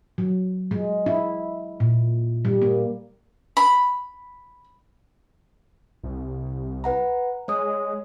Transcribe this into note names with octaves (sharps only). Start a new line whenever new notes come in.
F#3
G#3
E4
A#2
G3
A#3
B5
C2
B4 F#5 A#5
G#3 C#5 D#6